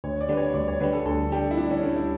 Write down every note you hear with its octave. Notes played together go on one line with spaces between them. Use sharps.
D2 C#5
D5
D3 G3 B4
C#5
D2 D5
C#5
D3 G3 B4
A4
D2 A4
D3 G3 G4
E4
D2 D4
C#4
D3 G3
E4